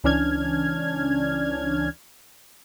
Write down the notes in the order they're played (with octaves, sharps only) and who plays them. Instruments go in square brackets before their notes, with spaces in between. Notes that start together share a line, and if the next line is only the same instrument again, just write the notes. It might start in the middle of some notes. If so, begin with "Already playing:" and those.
[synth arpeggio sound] C#2 E3 C#4 D4 F6 G#6